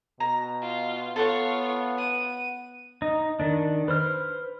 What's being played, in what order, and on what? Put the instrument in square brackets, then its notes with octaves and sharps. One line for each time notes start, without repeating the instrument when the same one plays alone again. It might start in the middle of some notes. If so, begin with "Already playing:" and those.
[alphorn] B2 [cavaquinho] A#5
[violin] F4
[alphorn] B3 [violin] F4 C#5 [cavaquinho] A4 F#5 C#6
[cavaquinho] F#5 [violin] D#7
[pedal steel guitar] D#4
D#3 D4
B4 C5 F6